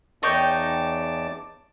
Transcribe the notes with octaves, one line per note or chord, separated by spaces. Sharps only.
E2 D#4 C#5 G5 A5 D6